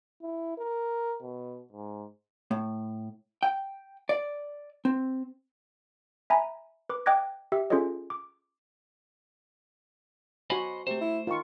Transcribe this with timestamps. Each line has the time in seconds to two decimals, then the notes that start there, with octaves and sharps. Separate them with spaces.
0.22 E4
0.58 A#4
1.23 B2
1.72 G#2
2.51 A2
3.43 G5
4.09 D5
4.85 C4
6.30 E5 G#5 A#5 B5
6.89 B4 D6
7.06 D#5 G5 D6 F#6 G#6 A#6
7.52 G4 E5 E6
7.70 C#4 F4 G#4 A4 C#5 D#5
8.10 D6
10.50 F#4 C5 D#5 G#5 B5
10.87 C3 A3 C5
11.01 E4
11.27 D#3 F4 C#6